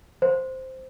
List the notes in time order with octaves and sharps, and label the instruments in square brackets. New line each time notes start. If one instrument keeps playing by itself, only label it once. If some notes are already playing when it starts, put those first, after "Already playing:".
[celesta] C5